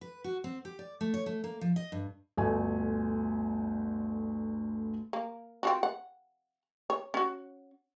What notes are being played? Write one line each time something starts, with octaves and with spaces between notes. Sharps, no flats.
B4
F#4
C4
G4
D5
A3
C#5
A3
A#3
F3
D#5
G2
G1 D2 A3 G#5
A#3
C4 F4 F#4
F#5
C#5
C#4 F#4